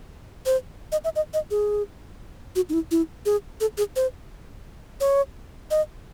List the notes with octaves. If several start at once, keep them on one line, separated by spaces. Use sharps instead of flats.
C5
D#5
E5
D#5
D#5
G#4
F#4
D#4
E4
E4
G#4
A4
G#4
C5
C#5
D#5